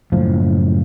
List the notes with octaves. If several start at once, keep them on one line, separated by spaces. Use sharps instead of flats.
F#1 A2 F3